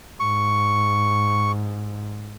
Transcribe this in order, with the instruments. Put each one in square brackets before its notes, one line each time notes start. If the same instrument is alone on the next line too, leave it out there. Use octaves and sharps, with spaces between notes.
[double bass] G#2 [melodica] C#6